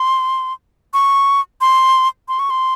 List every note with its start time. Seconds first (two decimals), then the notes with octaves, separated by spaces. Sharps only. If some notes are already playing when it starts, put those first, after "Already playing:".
Already playing: C6
0.94 C#6
1.61 C6
2.28 C6
2.39 C#6
2.50 C6